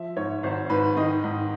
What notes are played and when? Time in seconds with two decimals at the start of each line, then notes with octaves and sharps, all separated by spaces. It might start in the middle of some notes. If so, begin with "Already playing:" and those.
Already playing: F3 E5
0.17 G#2 C#5
0.43 G#1 C5
0.70 G#2 B4
0.97 D#3 D#5
1.24 G#2